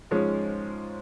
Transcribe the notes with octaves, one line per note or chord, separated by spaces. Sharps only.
G#2 F3 G#3 C#4